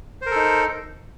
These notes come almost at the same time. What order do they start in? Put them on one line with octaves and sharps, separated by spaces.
C5 A#4 A4 D#4